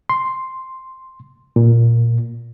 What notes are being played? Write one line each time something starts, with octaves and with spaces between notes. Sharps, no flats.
C6
A#2